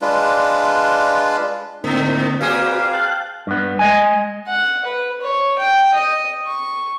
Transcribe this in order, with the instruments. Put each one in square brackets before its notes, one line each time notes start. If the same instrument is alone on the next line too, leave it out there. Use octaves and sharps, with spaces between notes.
[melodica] G#3 D4 F4 B4
[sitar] G#2 [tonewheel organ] D3 A#3 C4 [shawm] D#4
[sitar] A#3 C4 G#4 [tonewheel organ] F#4 B4 D5 [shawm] F5
[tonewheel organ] G5 A5 F#6
[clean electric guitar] G2 B3
G#3 D#5 G#5
[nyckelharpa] F#5
B4
C#5
G5
D#5
C#6